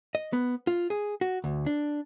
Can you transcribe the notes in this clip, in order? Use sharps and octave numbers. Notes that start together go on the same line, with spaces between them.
D#5
B3
F4
G#4
F#4
D2
D4